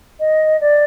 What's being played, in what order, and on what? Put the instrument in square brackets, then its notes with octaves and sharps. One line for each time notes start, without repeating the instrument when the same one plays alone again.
[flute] D#5
D5